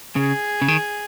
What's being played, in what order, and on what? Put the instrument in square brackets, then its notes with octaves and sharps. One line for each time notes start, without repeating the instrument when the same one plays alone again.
[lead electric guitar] C#3 [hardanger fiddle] G#4
[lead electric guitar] C#3
D#3